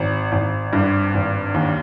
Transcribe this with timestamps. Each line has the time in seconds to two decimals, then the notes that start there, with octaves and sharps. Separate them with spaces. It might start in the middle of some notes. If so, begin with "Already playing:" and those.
Already playing: G#1
0.32 G#1
0.73 G2
1.14 G#1
1.54 D#2